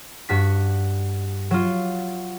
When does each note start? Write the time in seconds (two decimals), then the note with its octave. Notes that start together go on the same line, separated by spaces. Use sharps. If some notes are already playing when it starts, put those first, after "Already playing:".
0.29 G2 F#4 B6
1.51 F#3 F4